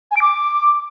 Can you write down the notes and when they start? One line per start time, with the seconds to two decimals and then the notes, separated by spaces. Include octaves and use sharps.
0.11 G#5
0.16 D7
0.22 D6